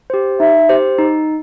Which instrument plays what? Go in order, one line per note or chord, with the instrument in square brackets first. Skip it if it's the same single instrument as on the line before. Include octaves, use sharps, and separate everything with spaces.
[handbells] G4 C5
[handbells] D#4 [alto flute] E5
[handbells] G4 C5
D#4